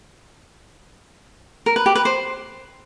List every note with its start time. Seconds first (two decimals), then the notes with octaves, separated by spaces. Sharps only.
1.66 A#4
1.76 B4
1.86 G4
1.95 B4
2.05 C5